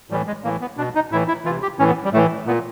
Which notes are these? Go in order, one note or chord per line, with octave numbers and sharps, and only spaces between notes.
A2 E3 G3
G#3
A2 E3 A#3
B3
B2 D4
D#4
A2 E3 E4
E4
C3 E3 F4
G4
A2 E3 C#4
B3
G3
A2 E3 A3
A#2 B3